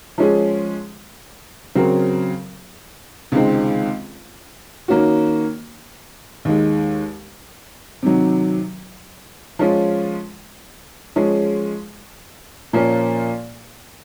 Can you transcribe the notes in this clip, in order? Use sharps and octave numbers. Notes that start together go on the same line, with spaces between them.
F3 G#3 C#4 G#4
C#3 F#3 C4 F#4 A#4
C#2 C3 D#3 G#3 C4
D#3 A#3 C#4 F#4
D#2 D#3 G#3
C3 D#3 F#3
F3 G#3 C#4 F4
F3 G#3 C#4 G#4
A#2 F3 A#3 C#4